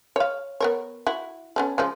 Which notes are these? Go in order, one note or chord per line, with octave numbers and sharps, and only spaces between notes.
C#5 F5
B3 A#4 C#5
E4 F#4
B3 C#4 A4
C#3 F3 G#3